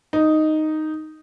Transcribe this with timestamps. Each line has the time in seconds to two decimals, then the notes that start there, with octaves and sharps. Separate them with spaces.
0.13 D#4